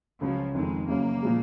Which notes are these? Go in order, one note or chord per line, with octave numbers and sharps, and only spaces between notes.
C#2 C#3 F3 F#3 C#4
F1 F2 D#3 G#3
F#1 F#2 C#3 F#3 A#3
A#2 F3 G#3